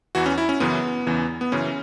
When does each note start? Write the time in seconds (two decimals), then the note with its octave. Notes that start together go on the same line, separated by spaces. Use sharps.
0.15 E2 E3 F#4
0.26 C#4
0.38 E4
0.49 C#4
0.60 F#2 C#3 E3 B3
1.07 E2 C#3 E3
1.41 B3
1.52 F#2 C#3 E3 C#4